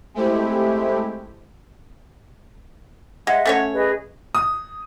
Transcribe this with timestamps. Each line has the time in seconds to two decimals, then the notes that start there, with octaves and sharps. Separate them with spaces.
0.14 G#3 A3 C4 E4 G4
3.27 G#3 D#5 E5 F#5
3.46 A3 C#4 C#5
3.73 G#4 B4 D#5
4.35 D#6